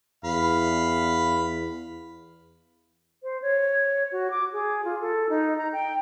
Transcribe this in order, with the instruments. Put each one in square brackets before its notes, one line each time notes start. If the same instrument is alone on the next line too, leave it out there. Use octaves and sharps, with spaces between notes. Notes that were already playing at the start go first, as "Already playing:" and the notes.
[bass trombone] E2 [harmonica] F5 B5
[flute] C5
C#5
F#4
D6
G#4
F4
A4
D#4
A#5
G5